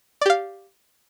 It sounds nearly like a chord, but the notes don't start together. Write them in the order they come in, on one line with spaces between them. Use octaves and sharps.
D5 G4 F5